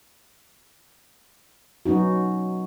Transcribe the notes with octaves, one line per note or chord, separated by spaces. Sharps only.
F#3 B3 C#4 D#4 F#4